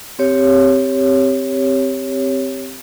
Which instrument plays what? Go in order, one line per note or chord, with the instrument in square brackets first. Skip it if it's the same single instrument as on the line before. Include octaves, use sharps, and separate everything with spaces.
[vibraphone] C4 G4 C#5